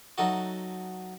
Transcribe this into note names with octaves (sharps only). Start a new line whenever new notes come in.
F#3 A3 D#4 F#4